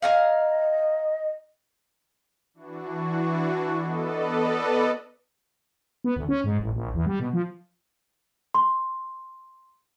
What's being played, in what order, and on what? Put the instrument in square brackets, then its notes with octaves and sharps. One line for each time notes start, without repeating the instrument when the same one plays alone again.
[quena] D#5 [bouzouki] F5 G#5 A#5
[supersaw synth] E3 D4 F#4
B3 A4 B4 D5 D#5
[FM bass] B3
D2
C#4
G#2
A1
A#1
E2
G3
B2
F3
[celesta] C6